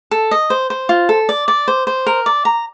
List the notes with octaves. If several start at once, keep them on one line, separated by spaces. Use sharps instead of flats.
A4
D#5
C5
C5
F4
A4
D5
D5
C5
C5
A#4
D5
A#5